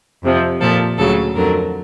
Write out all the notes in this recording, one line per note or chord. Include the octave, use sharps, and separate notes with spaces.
F2 C3 F3
A#2 F3 A4
D2 C#3 F#3 A4
F2 D3 F#3 A#4